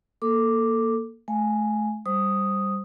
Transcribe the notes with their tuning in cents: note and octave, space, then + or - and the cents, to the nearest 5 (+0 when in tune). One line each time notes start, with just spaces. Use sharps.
A#3 +0 A4 +15 D6 +0
A3 -30 F5 +0 G#5 +0
G3 +0 C5 +5 D#6 +0